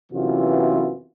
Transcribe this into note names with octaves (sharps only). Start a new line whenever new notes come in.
F#2 C3 E3 B3 F4